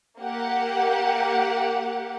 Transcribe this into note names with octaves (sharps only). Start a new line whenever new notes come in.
A#3 G4 F#5